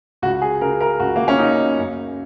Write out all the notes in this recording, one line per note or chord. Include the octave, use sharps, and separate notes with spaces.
C#2 F#4
G#4
C#3 A#4
A#4
C#2 F#4
A#3
C#4
C#3 D#4
F#2